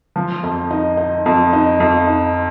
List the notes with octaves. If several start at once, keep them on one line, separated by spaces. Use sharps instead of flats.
F3
F2
D#4
D#4
F2
D#4
F2
D#4